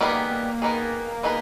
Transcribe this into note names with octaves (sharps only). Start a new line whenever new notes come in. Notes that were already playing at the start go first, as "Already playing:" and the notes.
D#3 G3 A#3 B3 D#4 G#4
A#3
D#3 G3 B3 D#4 G#4
B3 D#4 G#4 B4